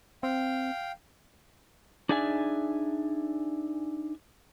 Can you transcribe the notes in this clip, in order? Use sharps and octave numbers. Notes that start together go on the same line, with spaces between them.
C4 F5 G5
D4 D#4 G#4 D5 E5 G#5